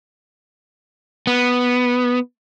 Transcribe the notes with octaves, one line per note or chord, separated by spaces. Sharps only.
B3